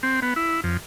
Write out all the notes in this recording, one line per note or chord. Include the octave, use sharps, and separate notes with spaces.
C4
B3
E4
F2